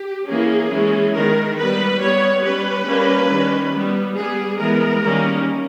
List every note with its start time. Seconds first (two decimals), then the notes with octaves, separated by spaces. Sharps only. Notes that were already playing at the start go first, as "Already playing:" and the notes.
Already playing: G4
0.28 E3 A#3 C#4 G#4
0.72 E3 G#3 C#4
1.14 D#3 G#3 B3 A#4
1.58 G3 B3 B4
2.01 G3 B3 C#5
2.44 G3 C#4 B4
2.87 G3 A#3 C#4
3.30 D#3 G3 C#4
3.73 G3 B3
4.16 G3 B3 G#4
4.59 E3 G#3 B3 A#4
5.03 D#3 G3 A#3 C#4